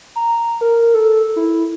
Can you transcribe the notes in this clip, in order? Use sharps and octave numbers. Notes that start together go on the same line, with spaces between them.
A#5
A#4
A4
E4